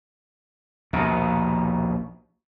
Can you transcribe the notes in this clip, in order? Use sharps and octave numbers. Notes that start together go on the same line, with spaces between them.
A#1 D#2 B2